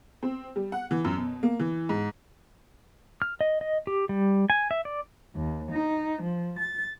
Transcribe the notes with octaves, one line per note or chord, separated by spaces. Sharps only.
C4
G3
F#5
E3
F#2
B2
A#3
E3
G#2
F6
D#5
D#5
G4
G3
G#5
E5
D5
D#2
D#4
F3
A6